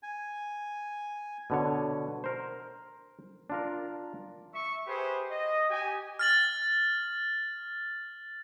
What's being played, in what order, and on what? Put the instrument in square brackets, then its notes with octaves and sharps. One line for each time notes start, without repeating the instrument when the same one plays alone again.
[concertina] G#5
[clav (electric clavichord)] B2 D3 C#5
A#4 C5
D4 F4 A#4
[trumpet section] E5 C#6
G4 G#4 B4 C5
D#5
G4 G#5
[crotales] F6 A6 F#7